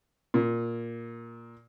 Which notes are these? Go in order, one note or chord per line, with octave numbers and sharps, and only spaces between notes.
A#2